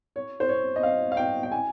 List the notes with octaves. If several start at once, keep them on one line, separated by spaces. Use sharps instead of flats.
C#5
C5
C#5
D#5
F5
F5
G5
G5
G#5